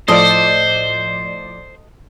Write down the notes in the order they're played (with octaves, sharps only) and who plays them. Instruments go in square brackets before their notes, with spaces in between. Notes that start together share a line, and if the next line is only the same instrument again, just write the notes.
[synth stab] A2 F3 D5 [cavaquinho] A4 D#5 [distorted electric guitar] C5